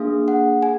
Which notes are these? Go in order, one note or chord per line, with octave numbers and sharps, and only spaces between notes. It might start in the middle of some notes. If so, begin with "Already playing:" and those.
Already playing: A#3 D4 G#4 F5
F#5
G#4 G#5